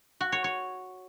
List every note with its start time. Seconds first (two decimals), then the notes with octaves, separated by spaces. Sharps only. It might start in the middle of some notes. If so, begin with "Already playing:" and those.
0.21 F#4
0.32 C#5
0.44 C#5